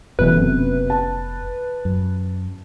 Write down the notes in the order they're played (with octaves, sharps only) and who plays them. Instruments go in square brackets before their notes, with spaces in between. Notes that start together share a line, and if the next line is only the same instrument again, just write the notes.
[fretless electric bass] F1 B3 [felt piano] B2 E3 A4 [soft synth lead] B4
[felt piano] F#2 C3
A5
[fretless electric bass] F#2